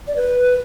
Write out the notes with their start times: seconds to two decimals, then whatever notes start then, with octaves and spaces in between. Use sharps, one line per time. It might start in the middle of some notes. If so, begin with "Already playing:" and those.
0.07 D5
0.16 B4